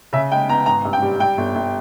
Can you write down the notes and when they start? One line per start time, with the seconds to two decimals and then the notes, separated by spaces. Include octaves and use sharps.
0.13 C#3 E5
0.31 G#3 G5
0.48 B3 A#5
0.66 G#1 A#5
0.85 G2
0.93 G5
1.02 G3
1.20 G3 G5
1.37 G1
1.55 G1